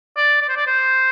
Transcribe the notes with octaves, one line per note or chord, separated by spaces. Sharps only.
D5
D5
C5
D5
C5